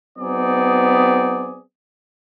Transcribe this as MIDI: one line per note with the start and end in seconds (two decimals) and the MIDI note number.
0.19 1.60 54
0.19 1.60 59
0.19 1.60 60
0.19 1.60 63
0.19 1.60 68
0.19 1.60 74